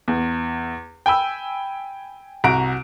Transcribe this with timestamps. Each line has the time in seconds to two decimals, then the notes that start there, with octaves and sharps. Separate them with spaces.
0.08 E2
1.06 G5 G#5 B5 E6
2.44 C2 F#4 A#5 D7